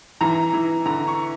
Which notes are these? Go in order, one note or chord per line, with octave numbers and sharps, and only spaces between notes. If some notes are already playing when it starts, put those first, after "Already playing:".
E3 A#5
E3
D3 A#5
C#6